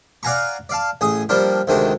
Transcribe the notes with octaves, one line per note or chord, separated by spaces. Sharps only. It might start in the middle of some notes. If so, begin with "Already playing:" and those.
D5 F5 F#5 G#5 A#5 C#6
D5 F5 A5
A1 G#4 G#5 D#6
F3 G3 A#3 D4 F4
D2 C3 D#3 G#3 D4